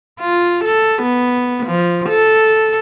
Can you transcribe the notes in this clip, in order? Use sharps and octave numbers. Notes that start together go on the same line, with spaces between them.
F4
A4
B3
F3
A4